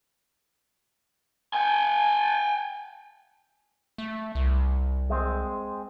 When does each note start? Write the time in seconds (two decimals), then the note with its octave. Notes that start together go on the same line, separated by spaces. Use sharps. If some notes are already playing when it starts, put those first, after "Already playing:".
1.53 G5 G#5
3.98 A3
4.35 C2
5.10 G#3 C4